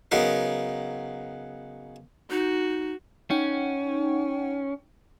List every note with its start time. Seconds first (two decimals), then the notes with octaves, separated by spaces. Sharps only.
0.12 C#3 F#3 B3 D#4 A#4
2.31 D#4 F#4
3.30 C#4 D#4 F#5 G5